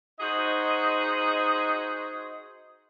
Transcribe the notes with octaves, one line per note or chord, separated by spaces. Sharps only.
D#4 F#4 G#4 C5 D#5